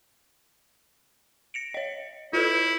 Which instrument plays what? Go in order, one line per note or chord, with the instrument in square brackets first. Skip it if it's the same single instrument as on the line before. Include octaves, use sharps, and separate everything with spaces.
[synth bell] A#6 C#7 D7
C#5 D#5
[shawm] E4 [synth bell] F4 A4 B4